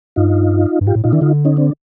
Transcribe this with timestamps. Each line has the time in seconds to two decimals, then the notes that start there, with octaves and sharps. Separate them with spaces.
0.16 G2 D#4 F4
0.81 G2
0.86 G#2 F4 G4
0.95 A2
1.04 A#2 D#4 F4
1.12 D#3 D4 E4
1.21 D3 D#4 F4
1.45 C#4 D#4
1.57 C4 D4